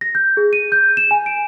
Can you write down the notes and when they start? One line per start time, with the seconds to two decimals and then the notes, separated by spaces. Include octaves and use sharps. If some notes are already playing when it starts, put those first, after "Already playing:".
0.01 A#6
0.15 G6
0.37 G#4
0.53 D#7
0.72 G6
0.97 E7
1.11 G#5
1.26 D7